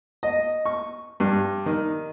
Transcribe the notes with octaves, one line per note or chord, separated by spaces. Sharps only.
D#5
C#6
G2
D#3